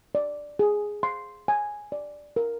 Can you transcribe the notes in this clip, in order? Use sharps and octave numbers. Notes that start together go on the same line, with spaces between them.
D5
G#4
C6
G#5
D5
A#4